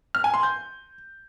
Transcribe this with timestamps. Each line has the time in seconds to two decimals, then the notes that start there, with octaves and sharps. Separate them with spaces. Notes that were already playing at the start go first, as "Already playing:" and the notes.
0.15 F6
0.24 G#5
0.34 C6
0.43 G6